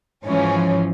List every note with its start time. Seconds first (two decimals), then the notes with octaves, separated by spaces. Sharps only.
0.23 G#2 E3 F3 C#4